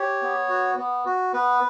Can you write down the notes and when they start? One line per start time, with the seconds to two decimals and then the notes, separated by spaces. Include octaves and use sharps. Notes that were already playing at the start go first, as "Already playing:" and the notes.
Already playing: G4 C#5
0.22 B3
0.49 F#4
0.78 B3
1.06 F#4
1.33 B3 B4